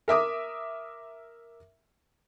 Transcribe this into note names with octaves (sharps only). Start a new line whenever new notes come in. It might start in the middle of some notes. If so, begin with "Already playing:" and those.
A#4 E5 D6 D#6